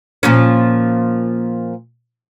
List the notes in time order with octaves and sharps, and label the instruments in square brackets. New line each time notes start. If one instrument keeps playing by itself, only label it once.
[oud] A#2 F3 C#4